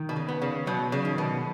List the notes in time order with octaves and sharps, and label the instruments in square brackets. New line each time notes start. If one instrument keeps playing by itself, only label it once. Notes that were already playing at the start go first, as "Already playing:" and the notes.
Already playing: [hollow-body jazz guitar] D#3
[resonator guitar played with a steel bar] B2
C#3
[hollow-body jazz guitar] B3
[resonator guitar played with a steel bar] C#3
[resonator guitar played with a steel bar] B2 [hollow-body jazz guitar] F#3
[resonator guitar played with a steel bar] C#3
[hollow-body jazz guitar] D#3
[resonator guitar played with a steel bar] B2